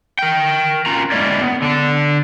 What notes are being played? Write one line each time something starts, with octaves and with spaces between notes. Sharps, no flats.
A#4 G5
C#4 F4 A#5
G#3 A#3 C#4 D4 E4 D5
B3
D3 D4